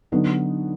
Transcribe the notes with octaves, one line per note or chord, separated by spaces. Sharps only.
D3 F#3 B3 D#4 F#4